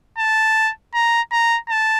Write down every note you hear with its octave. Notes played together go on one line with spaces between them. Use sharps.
A5
A#5
A#5
A5